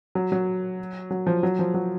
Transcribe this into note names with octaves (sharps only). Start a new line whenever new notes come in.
F#3
F#3
F#3
F3
F#3
F3
F#3